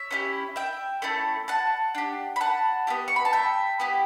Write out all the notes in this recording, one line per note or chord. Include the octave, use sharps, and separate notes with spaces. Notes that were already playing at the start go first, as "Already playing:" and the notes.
Already playing: C#5 E5
C#4 E4 G4
E5 G5
A3 C#4 E4 A4
F#5 A5
D4 G4
B5
F#5 A5
B3 E4 G4
C#6
B5
A5
E5 G5
B3 E4 G4